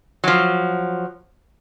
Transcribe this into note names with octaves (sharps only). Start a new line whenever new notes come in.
F3 F#3